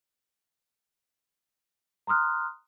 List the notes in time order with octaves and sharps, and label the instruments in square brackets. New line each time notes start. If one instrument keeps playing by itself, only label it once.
[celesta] A#5 C6 D#6 F6 F#6